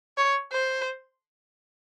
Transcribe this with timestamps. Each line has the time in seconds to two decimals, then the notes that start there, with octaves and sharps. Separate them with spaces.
0.18 C#5
0.53 C5